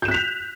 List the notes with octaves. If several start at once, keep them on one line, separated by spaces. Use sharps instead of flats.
F#6 G6 B6 E7 F7